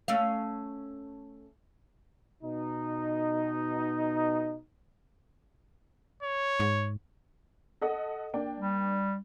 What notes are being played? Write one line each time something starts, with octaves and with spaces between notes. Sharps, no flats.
A3 C#4 F5
B2 D#4
C#5
G#2
A4 D#5 F#5
A#3 D4 G5
G3